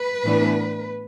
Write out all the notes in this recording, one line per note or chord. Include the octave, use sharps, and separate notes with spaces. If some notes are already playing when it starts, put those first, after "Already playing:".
Already playing: B4
A2 E3 B3 D4